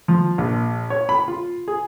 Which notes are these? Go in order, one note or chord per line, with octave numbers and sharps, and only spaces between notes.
F3
A#1
C#5
B5
F4
G#4